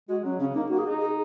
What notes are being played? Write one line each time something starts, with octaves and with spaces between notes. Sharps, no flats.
G#3 F#4
F#3 C#4
C#3 C#4
A#3 D#4
A#3 F#4
G#4
D#4
G#4